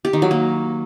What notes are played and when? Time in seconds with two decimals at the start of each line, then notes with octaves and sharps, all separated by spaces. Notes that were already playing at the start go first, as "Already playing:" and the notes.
0.05 G4
0.13 D#3
0.22 F#3
0.31 A#3